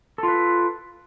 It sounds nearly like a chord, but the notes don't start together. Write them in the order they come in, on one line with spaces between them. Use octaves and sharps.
A4 F4 B4